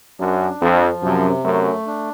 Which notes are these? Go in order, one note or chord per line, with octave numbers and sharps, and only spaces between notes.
F#2 D4
F2 F3
F#2 C3
F#2 A3
D4